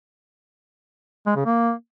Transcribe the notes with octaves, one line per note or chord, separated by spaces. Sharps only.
G#3
C#3
A#3